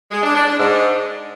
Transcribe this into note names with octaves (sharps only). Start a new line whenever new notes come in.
G#3
D4
D4
D4
G#2